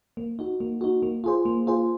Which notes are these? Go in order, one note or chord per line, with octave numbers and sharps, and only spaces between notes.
A#3
D#4 F#4
A#3
D#4 F#4
A#3
F4 G#4 C5
A#3
F4 G#4 C5